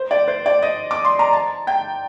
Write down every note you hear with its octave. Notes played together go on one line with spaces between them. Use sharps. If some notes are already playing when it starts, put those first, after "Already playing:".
Already playing: C5
D5
C5
D5
D#5
D6
C6
A#5
A5
G5